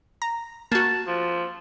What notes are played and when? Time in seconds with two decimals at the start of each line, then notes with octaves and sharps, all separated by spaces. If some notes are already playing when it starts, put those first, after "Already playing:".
0.22 A#5
0.72 A#3 F#4 A5
1.07 F3